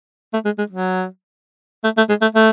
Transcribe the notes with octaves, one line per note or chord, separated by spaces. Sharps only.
A3
G#3
G#3
F#3
A3
A3
G#3
A3
A3